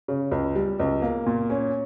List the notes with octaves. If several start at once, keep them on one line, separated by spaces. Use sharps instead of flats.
C#3
C#2
G3
C#2
A#3
A#2
C#4